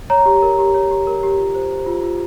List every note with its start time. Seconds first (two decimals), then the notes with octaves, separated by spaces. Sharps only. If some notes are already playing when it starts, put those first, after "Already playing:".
0.10 C#5 A#5
0.26 G4
0.42 A#4
0.59 G4
0.74 C#5
0.91 G4
1.07 A#4
1.23 G4
1.38 F4
1.54 C5
1.71 C5
1.86 F4
2.03 F4